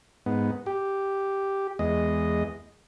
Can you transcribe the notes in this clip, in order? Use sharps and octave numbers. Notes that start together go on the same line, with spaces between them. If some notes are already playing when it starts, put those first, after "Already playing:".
G#2 B3
G4
E2 G#3 D#5